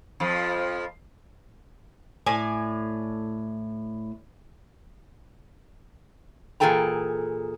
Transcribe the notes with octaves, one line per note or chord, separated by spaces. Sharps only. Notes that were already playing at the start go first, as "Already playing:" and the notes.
F2 F3
A2 D5 G#5
A#2 E3 G#4 A4 G5 A#5